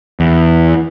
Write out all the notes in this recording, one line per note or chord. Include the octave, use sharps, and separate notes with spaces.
E2